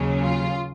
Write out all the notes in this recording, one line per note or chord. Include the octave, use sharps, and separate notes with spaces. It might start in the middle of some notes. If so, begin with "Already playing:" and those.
Already playing: D#2 C#3 F#3 C#4
F4